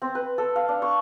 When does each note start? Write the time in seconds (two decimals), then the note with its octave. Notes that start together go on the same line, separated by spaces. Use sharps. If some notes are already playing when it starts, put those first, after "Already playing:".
0.02 C4
0.15 B4
0.38 A4
0.56 F5
0.68 D4
0.82 C#6